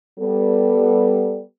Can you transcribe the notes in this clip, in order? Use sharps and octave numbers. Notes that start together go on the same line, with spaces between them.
G3 B3 A4